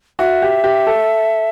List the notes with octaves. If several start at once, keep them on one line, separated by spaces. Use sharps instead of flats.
F#4 E5
G4
G4
A4